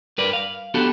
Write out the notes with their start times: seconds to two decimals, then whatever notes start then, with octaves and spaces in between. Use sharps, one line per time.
0.18 G2 A#4 B4 D5
0.33 F5
0.74 B3 D4 F#4 G4 A4